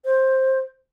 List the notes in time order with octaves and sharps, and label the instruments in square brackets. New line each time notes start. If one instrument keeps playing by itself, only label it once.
[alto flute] C5